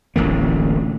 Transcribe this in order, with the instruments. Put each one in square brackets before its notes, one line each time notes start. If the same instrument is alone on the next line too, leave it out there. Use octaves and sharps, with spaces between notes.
[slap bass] D1 A1 D3 A#3